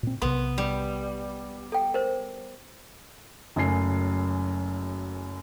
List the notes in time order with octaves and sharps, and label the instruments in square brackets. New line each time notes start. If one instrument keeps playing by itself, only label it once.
[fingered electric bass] A#2 C4
[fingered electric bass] B1 C3 [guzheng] B3 [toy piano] C6
[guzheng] G3
[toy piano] A4 G5
A#4 C5
[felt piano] F#1 F#2 A3 G#5 C7